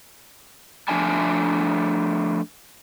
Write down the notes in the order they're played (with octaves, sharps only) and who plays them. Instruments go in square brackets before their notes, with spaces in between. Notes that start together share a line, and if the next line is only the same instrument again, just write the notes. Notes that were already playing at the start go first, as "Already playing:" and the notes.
[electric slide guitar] F3 A3 D4 E5 G#5 A5